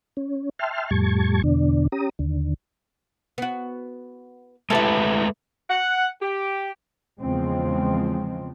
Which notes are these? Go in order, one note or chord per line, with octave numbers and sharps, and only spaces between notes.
C#4
E5 G5 A5 C6 F6
F2 A2 G3 A5 C#6 G#6
E2 B2 D3 D4
C#4 G4 A#5 D#6
D#2 D3
B3 F#4
G#3 A3 E4 G4 A4 B4
F#5
G4
E2 C#3 F3 G#3 C4